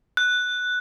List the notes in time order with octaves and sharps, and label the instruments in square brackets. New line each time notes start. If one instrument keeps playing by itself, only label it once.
[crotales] F#6